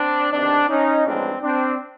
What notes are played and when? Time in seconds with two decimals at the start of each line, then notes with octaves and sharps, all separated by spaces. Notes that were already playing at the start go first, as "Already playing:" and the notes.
Already playing: C4 D4
0.32 E2 C3 D#3 C4 D4
0.69 C#4 D#4
1.06 B1 A2 F3 G#3 B3 C4 D4
1.42 C4 D4